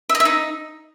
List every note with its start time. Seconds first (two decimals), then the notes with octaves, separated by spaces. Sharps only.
0.09 E5
0.15 D#5
0.20 E5
0.25 D#4